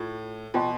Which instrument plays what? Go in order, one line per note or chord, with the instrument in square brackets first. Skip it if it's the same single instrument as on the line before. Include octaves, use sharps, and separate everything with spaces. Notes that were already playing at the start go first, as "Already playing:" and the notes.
Already playing: [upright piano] A2 [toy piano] F4
[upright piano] B2 [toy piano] F4 C5 G5 C6